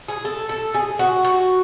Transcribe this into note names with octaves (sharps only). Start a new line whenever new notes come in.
G#4
A4
A4
G#4
F#4
F#4